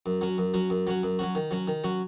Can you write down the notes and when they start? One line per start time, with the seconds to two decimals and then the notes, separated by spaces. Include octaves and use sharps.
0.06 F#2
0.21 F#3 C#4 F#4
0.38 F#2
0.54 F#3 C#4 F#4
0.70 F#2
0.87 F#3 C#4 F#4
1.03 F#2
1.19 F#3 C#4 F#4
1.35 D#3
1.51 F#3 C#4 F#4
1.68 D#3
1.84 F#3 C#4 F#4